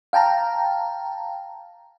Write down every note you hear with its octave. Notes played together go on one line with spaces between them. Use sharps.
F5 G5 A5 A#5